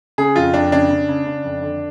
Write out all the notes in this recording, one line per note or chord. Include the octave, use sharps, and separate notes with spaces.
C#3 G#4
F2 F4
F2 D4
C#3 D4
C#3
C#3
C#3
F2
D3